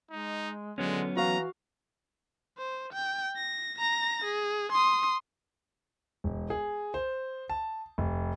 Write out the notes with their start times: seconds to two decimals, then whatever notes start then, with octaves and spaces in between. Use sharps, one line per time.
0.11 G#3 D#4
0.78 D3 F#3 G#3 B3 C#4
1.17 E3 F#4 F5 A#5
2.58 C5
2.93 G5
3.37 A#6
3.79 A#5 A#6
4.24 G#4
4.72 C6 D#6
6.24 E1
6.50 G#4
6.94 C5
7.50 A5
7.98 F1